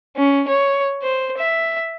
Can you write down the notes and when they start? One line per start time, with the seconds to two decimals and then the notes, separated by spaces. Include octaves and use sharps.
0.17 C#4
0.48 C#5
1.02 C5
1.38 E5